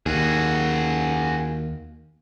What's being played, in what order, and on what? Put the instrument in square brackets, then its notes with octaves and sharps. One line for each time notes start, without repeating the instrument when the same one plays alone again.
[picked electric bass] D#2 [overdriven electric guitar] F#4 G#4